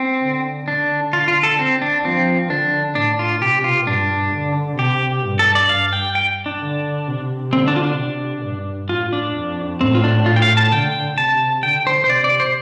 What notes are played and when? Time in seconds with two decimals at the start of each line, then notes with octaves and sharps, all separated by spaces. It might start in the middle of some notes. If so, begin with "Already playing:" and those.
Already playing: C4
0.22 D3
0.67 D3 D4
1.13 F4
1.28 F4
1.43 A4
1.59 C4
1.82 D4
2.04 F3 C4
2.50 D3 D4
2.95 A2 D4
3.19 F4
3.42 C3 G4
3.64 F4
3.87 G2 D4
4.32 D3
4.78 C3 G4
5.24 G2
5.39 A4
5.55 D5
5.69 G2 F5
5.93 G5
6.15 G5
6.46 D4
6.61 D3
7.07 C3
7.53 D3 C4
7.68 D4
7.76 F4
7.83 D4
7.98 C3
8.44 G2
8.89 A2 F4
9.13 D4
9.36 F2
9.81 A2 C4
9.95 F4
10.04 D4
10.26 F4
10.36 G5
10.42 F5
10.57 A5
10.72 D3 G5
11.18 C3 A5
11.63 D3 G5
11.87 C5
12.04 C5
12.09 C3 D5
12.24 D5
12.40 C5